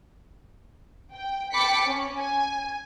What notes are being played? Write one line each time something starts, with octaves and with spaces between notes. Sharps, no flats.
G5
G5 A5 B5 D6 B6 C#7
C#4
G#5